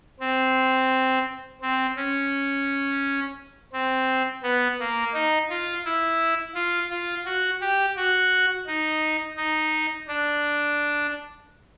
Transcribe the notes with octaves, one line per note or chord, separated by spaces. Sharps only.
C4
C4
C#4
C4
B3
A#3
D#4
F4
E4
F4
F4
F#4
G4
F#4
D#4
D#4
D4